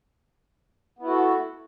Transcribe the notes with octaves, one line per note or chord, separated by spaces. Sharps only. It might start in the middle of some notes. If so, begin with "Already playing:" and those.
B3 E4 F#4 A4